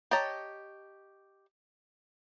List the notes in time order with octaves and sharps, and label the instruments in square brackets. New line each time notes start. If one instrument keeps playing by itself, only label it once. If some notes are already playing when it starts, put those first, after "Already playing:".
[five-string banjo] G4 C#5 D#5 A5 A#5